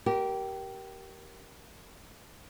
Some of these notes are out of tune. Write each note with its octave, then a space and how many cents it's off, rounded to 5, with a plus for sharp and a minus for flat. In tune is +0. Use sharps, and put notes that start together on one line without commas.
G4 -20 A#4 +10